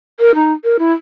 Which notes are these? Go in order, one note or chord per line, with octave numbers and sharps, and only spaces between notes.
A#4
D#4
A#4
E4